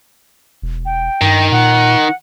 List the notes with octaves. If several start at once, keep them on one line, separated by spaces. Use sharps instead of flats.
E1
G5
G2 D#3
A#2 F#5